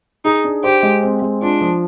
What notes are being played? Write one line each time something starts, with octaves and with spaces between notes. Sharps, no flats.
D#4 G#4
D4
G4 C5
G#3
C4
G#3
D4 F4
F3